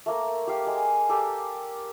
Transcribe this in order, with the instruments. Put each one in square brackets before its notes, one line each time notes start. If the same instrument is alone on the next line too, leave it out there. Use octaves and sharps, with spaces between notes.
[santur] A3 A#3 A#5
G4 F5 G5
G#3
G4 A4 A#4 D6